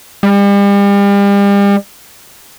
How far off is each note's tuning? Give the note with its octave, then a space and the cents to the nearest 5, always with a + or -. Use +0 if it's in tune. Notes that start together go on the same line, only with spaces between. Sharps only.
G3 +40